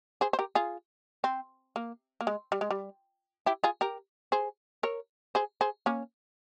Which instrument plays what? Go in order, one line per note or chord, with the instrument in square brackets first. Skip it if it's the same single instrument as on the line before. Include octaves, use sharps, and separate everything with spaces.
[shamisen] G#4 C5
C5
G4 A#4
F4 G#4
C4
A#3
A#3
G#3
G3
G#3
G3
E4 G4
F4 G#4
G4 A#4
G#4 C5
A#4 C#5
G#4 C5
G#4 C5
A#3 C#4